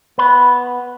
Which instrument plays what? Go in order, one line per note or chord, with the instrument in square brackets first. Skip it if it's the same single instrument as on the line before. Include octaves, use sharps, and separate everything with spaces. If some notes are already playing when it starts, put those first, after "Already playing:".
[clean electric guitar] B3 B5